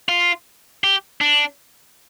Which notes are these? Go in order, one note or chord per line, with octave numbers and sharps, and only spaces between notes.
F4
G4
D4